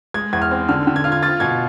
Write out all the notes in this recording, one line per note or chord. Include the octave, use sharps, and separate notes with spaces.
G#3 G#6
E2 G#6
F6
C4
D3 F6
D3
G#6
F4 F6
G#6
F4 A6
B2 G#6